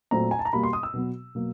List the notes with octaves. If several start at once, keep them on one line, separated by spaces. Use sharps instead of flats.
A#2 F#3 A3 C4 A#5
G#5
A5
A#5
B2 G3 A#3 B5
C6
D#6
E6
B2 F#3 B3
B2 F#3 A#3